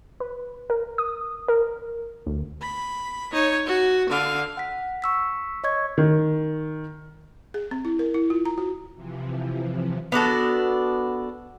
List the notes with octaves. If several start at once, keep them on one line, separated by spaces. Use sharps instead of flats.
B4
A#4
D#6
A#4
D2
B5
D#4 C#5
F#4
D3 F5
F#5 B6
C#6 E6 B6
C#5 D#5 C#6 G#6
D#3
G#4
C4
E4
A#4
E4
F4
A#5
F#4
C3 E3 F3
B3 D4 F#4 A4